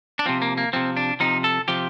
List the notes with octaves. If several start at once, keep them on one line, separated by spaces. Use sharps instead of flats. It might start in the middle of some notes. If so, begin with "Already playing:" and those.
D4
C3 F3 C4
A#3
A#3
C3 F3 C4
D4
C3 F3 D#4
A4
C3 F3 G4